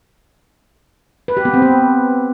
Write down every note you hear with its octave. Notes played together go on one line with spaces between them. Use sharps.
B4
G4
B3
C4
B3